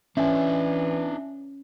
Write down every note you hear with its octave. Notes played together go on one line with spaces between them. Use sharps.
E3 C#4 D4 E4 E5 G#5